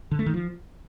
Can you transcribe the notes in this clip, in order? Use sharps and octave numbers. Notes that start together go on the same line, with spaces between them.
D3
A3
D#3
F3